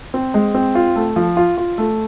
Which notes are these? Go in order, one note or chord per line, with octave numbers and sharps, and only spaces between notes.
C4
G#3
C4
F4
A3
F3
F4
F4
A3